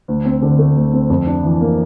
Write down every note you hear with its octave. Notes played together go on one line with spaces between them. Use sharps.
D2
C4
D3
A3
D2
C4
F2
D4
E3
A#3